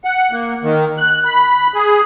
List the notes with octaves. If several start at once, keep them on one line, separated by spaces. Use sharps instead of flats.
F#5
A#3
D#3
F#6
B5
G#4